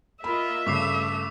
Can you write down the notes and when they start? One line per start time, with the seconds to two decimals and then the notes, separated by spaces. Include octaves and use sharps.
0.24 A#3 F4 D#5 E5 B5
0.66 G2 C#3 A3 C#6 D6 C7